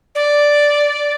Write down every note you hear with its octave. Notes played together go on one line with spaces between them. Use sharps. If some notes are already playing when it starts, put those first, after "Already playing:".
D5